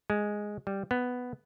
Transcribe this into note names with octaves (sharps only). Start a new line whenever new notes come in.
G#3
G3
B3